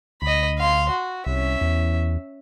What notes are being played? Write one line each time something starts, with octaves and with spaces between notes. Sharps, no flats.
D2 D#5 B5
F5 C6
F#4
C2 C#4 E5
E2